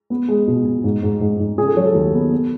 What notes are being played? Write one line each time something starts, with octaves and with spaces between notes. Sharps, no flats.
B3
G#3
B2
B2
G#2
G#2
G#2
G#2
C#3 G#4
A4
F#3 C#5
A4
D#2
B3
B3